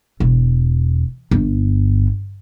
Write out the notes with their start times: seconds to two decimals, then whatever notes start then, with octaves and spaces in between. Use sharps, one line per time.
0.20 E1
1.31 G1